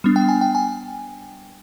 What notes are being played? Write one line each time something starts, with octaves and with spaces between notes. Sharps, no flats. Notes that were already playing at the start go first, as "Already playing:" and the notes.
G3 B3 D4
G5
G#5
G5
G#5